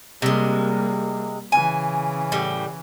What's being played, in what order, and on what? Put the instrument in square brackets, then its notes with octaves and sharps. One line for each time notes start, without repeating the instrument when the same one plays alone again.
[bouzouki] C3 G#3 [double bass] G3 A#3
[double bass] C#3 E3 [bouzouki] G#5
[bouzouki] A2 G3